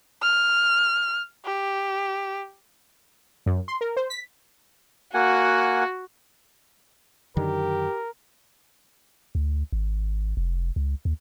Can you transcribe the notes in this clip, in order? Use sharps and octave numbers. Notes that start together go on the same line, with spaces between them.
F6
G4
F#2
C6
A#4
C5
B6
A#3 F#4 F#5 G#5
F#2 D3 D#3 G4 A#4
D2
G#1
F1
C#2
D#2